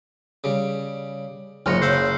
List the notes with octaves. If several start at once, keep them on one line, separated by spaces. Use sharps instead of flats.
C#3 G3
F#1 G#2 F3 C#5 F6 A#6 C#7
C#3 C5 F#5 E6 G6 C7